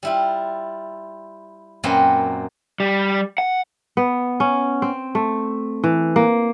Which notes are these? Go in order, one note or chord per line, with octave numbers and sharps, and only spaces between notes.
G3 E4 F4
F#2 A#2 A#3 C4 B4 C#5
G3
F#5
B3
C#4
C4
A3
E3
A#3